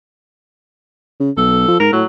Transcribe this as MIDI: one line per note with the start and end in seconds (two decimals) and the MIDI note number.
1.20 1.31 49
1.37 1.68 35
1.37 1.77 69
1.68 1.77 53
1.80 1.90 44
1.80 1.91 70
1.92 2.03 45
1.92 2.06 54